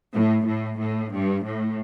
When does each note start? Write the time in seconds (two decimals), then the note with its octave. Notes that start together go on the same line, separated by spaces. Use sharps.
0.13 A2
0.46 A2
0.79 A2
1.12 G2
1.43 A2